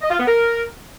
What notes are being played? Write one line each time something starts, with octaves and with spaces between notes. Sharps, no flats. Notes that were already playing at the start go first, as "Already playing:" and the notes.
D#5
F4
B3
A#4